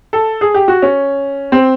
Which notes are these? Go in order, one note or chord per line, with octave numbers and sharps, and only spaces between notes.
A4
G#4
G4
F#4
C#4
C4